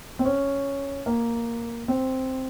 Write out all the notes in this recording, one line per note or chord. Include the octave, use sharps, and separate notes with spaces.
C4
C#4
A#3
C4